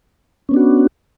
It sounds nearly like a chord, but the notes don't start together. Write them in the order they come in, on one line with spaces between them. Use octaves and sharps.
C#4 B3 D4 F#4